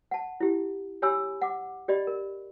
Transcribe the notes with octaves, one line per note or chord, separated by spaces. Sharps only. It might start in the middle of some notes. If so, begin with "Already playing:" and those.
F#5 A5
E4 G4
G4 C#5 G#5 B5 E6
F#5 D6
G4 D5 D#5 B5
A#4